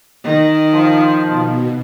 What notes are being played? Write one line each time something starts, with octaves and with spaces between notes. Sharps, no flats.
D#3
F3
B2